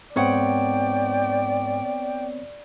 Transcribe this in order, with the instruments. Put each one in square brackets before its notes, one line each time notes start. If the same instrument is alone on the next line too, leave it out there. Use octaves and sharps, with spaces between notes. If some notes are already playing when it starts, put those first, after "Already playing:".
[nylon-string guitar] G#2 F#5 [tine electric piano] B3 C4 C#5 [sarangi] D5 [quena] G5